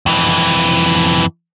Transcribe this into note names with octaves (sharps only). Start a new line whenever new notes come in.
F2 E3